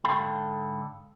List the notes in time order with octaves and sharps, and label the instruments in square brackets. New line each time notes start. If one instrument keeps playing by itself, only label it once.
[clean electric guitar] G#2 D3 A4 F5 G5 B5